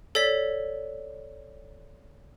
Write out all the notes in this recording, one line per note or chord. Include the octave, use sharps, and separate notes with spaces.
A4 C#5 D5 B6